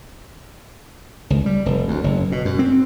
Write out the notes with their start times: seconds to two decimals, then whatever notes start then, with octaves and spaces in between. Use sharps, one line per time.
1.30 C#2
1.46 G3
1.66 F1
1.88 D2
2.04 F#1
2.32 B2
2.45 F#2
2.59 C4